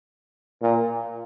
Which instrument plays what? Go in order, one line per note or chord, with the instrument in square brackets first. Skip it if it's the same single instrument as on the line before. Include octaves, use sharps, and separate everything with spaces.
[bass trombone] A#2